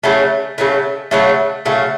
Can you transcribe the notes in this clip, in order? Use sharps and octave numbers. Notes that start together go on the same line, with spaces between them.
C#3 F#3 A3
C#3 F#3 A3
C#3 F#3 A3
C#3 F#3 A3